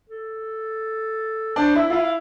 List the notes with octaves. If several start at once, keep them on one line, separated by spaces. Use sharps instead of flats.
A4
D4 C5
E4 E5
F4
E4 F5
F5